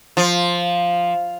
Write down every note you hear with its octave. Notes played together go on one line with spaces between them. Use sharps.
F3